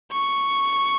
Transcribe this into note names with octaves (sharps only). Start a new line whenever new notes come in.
C#6